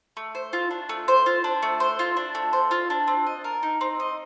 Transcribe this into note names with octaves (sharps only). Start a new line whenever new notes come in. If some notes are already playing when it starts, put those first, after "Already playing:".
A3
C5
F4
D4
A3
C5
F4
D4
A3
C5
F4
D4
A3
C5
F4
D4
C4
D#5
A#4
D#4
C4
D#5